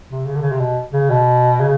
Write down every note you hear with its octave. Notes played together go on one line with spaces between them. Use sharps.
C3
C#3
D3
C#3
C3
B2
C#3
B2
C#3